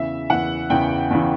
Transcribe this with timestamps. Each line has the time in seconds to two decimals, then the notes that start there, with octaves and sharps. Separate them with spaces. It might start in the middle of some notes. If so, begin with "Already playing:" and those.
Already playing: E2 C#3 E3 E5
0.30 E2 C#3 E3 F#5
0.70 E2 C#3 E3 G5
1.10 E2 C#3 E3